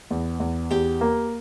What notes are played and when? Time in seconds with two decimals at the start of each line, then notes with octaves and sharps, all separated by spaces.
0.10 E2
0.40 E2
0.71 E2 G4
1.01 A#3